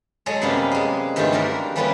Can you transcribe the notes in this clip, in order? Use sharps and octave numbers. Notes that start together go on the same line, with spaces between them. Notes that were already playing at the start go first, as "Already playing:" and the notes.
F#3 G#3 G#4 A4 C#5 A#5
F#2 C3 G3 A#3 B3 C#4
G#3 G#4
G2 D#3 E3 A3 D#4 F4
G3 A#3 D4 F#4 A#4
E3 F3 G3 A#3 B3 C#4